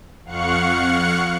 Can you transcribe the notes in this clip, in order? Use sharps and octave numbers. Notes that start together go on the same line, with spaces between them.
F2 F5 F#5 C#6 F#6 C#7